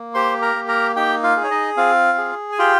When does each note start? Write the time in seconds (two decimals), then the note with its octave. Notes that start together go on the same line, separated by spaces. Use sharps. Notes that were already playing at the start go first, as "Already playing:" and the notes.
Already playing: A#3
0.14 G4 C5 C6
0.42 A#4 A#5
0.55 A#3
0.68 A#4 A#5
0.96 D#4 G4 G5
1.23 F4 F5
1.36 G#4
1.44 C#5
1.51 D#4 D#5
1.77 C4 F4 F5
2.18 G#4
2.52 G#5
2.58 F4 G4 G5